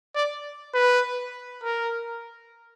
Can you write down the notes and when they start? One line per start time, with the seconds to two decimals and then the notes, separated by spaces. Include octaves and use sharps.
0.15 D5
0.74 B4
1.64 A#4